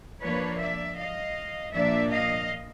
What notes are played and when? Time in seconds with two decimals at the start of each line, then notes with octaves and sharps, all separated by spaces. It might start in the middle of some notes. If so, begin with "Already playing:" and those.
0.22 F3 A#3 D4 B4 C#5
0.60 D5 E5
0.98 D#5 F5
1.74 A#2 F3 A#3 D4 D5 E5
2.11 D#5 F5